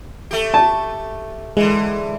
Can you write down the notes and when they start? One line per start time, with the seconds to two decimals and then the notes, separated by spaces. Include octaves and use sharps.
0.31 A3 G4
0.54 A5
1.57 D3 E3 G#3